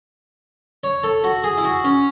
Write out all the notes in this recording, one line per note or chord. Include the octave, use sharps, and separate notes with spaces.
C#5
A4
F#4
G#4
E4
F#4
C#4